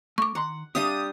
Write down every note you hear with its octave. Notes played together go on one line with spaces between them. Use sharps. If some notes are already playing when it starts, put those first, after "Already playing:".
A3 C#6 D6
D#3 F#5 A#5 C6
G3 C4 D4 G4 E5 F5 D#6